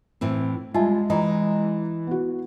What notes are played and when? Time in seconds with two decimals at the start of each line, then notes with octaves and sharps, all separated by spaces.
0.21 A2 E3 C4
0.74 G3 G#3 F4 E5 G#5 A5
1.10 E3 D#5 A#5
2.07 B3 F#4